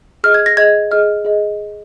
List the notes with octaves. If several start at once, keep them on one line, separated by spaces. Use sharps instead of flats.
G#4 D#5 F6
G#6
A#6
G#4 D#5 G#6
G#4 D#5 F6
G#4 D#5